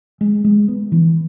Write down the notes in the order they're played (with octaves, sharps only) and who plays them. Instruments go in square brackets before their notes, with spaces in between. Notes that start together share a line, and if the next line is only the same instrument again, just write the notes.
[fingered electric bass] G#3
G#3
B3
E3